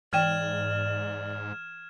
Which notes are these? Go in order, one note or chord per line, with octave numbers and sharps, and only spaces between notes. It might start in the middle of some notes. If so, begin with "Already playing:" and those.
G#2 E3 D5 G5 F6 G#6 E7